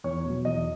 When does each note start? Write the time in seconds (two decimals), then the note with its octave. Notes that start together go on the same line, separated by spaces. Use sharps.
0.04 E2 C#5
0.25 B2
0.30 F#3
0.45 E2 D#5